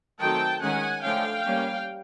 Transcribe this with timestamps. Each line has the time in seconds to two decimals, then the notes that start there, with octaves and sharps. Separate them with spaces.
0.20 D#3 F#3 A3 C4 G5 A5
0.62 D#3 G#3 C#4 F#5 G#5
1.03 D3 F3 A3 C#4 F5 G5
1.45 G3 A#3 C#4